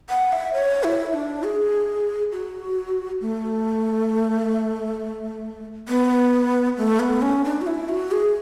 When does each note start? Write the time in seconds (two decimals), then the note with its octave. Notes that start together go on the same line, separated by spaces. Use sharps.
0.09 F#5
0.32 E5
0.54 C#5
0.84 E4
1.14 D4
1.43 G#4
2.32 F#4
3.21 A3
5.89 B3
6.77 A3
7.00 B3
7.22 C#4
7.44 D4
7.61 F#4
7.67 E4
7.89 F#4
8.12 G#4